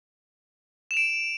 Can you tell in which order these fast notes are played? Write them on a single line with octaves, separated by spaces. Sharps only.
E7 F7 D7